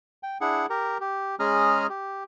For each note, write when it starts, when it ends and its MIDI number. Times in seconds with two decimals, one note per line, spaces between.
0.23 0.38 79
0.41 0.66 62
0.41 0.66 64
0.41 0.66 68
0.41 0.66 78
0.70 0.98 67
0.70 0.98 70
0.70 0.98 82
1.00 1.35 67
1.40 1.87 56
1.40 1.87 61
1.40 1.87 68
1.40 1.87 82
1.40 1.87 87
1.40 1.87 89
1.89 2.24 67